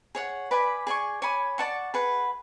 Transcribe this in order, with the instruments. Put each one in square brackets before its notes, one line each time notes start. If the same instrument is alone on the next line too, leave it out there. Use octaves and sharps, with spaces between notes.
[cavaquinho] G#4 C#5 F#5
B4 D5 G#5 B5
G#4 D5 G#5 C#6
C#5 G#5 B5 D6
D5 F#5 A5 C#6
G#4 B4 F#5